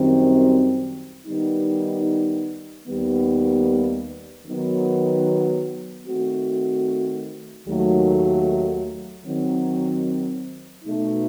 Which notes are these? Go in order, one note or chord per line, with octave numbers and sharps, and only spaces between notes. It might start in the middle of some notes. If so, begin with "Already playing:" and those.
Already playing: F#2 D#3 G3 C4
D#3 G3 B3 D#4
D#2 D#3 G3 B3
D#3 F#3 B3
D#3 A3 C4 F#4
D#2 D#3 F#3 A3
D#3 F#3 C4
B2 A3 D#4